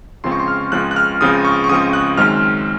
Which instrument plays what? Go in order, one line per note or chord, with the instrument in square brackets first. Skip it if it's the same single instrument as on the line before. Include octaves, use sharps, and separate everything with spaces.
[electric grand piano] C#2 C#3 F3 C4 C6
C#6
C6
F6
C#2 C#3 F3 C4 F#6
F#6
F6
C#2 C#3 F3 C4 D#6
C#6
C#6
C#2 C#3 F3 C4 D#6
F#6
F#2 D#3 G#3 C4 F6